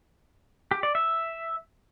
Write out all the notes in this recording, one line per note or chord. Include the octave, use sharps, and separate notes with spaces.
G4
D5
E5